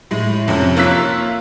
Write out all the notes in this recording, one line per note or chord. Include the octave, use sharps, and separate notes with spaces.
A2 G#3
F2 C3 C#4
A#3 F4 C#5 E6 F#6 B6